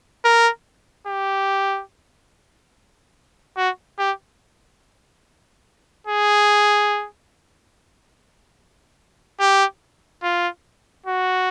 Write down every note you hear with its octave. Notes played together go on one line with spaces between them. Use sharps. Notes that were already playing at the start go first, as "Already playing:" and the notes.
A#4
G4
F#4
G4
G#4
G4
F4
F#4